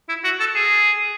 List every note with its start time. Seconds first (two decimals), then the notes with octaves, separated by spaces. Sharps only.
0.09 E4
0.24 F#4
0.40 A4
0.55 G#4